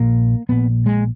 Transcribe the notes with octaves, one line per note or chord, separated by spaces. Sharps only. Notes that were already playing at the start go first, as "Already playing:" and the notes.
Already playing: A#1 A#2 A#3
A#1 A#2 B3
G#3